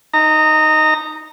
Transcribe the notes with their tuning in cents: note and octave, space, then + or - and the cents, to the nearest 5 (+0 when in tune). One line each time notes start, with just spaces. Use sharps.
D#4 +0 A#5 -25